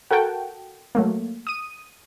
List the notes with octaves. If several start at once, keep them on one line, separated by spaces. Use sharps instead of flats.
F#4 A4 A#4 F#5 G5 A5
F#3 A3 A#3
D#6 D#7